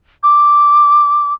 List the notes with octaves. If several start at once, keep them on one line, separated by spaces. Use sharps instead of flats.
D6